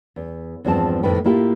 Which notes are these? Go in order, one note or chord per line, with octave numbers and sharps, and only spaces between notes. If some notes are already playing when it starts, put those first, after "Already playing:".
E2
E2 G2 F3 G#3 C4 A5
F2 A2 D#3 B4 G5
A2 A#3 E4 F4 G4